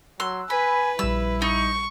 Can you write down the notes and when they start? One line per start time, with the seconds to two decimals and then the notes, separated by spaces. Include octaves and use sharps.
0.20 F#3 C6 E6 F#6
0.50 B4 G#5 B5
0.99 A#1 G3 E4 E6
1.42 D#4 C#6